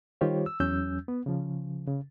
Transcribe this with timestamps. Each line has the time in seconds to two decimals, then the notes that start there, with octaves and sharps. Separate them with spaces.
0.21 D#3 G3 F4 G4 C5 C#5
0.46 E6
0.60 E2 F#3 C#4 E6 G6
1.08 B3
1.26 C#3 F3
1.88 C#3